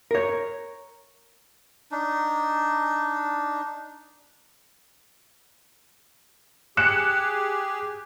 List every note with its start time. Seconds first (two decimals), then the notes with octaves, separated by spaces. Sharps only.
0.11 A#4 C#5
1.92 D4 D#4
6.77 G4 G#4 F#6 C#7 E7